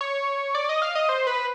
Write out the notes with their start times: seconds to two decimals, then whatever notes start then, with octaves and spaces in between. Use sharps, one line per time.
0.01 C#5
0.55 D5
0.69 D#5
0.82 F5
0.95 D#5
1.09 C5
1.27 B4